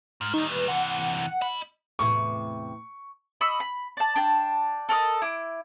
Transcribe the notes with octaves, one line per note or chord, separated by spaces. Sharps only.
G#2 F6
D#3 G3 D#4
B4
C3 E3 F#5
D#5 B5
E2 A2 C3 C#6
D#5 B5 C#6 E6
B5
D5 A5
D4 G5 A5
A4 A#4 D5 D#5
E4 D6